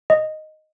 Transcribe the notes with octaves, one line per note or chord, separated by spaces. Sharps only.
D#5